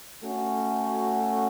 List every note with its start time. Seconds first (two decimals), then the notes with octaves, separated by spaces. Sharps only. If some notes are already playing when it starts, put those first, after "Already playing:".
0.22 A3 C#4 F#4